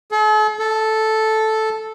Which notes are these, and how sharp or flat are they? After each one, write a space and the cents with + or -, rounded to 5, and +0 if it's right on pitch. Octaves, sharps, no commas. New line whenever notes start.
A4 -45
A4 -5